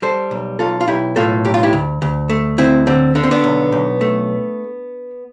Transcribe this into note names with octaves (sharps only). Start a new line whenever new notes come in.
G3 A4 C5
B1
B1 F4 A4
F4
B1 E4 G4
A2 F4 A4
B1 G4
F4
E4 G4
D2
D2
A3
D2 C4 E4
D3 C4
D3 D4
C4
B3 D4
B1
B1
A3